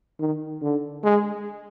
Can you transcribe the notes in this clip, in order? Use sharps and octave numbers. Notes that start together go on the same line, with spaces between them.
D#3
D3
G#3